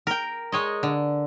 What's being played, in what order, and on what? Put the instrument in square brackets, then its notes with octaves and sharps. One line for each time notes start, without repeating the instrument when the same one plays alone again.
[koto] A#4 G5
G#3 C#5 D#5
D3